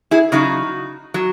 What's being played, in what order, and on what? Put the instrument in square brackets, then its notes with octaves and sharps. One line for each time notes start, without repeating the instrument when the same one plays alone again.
[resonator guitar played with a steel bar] E4 G#4
C#3 F#3 D#4 F#4
F#3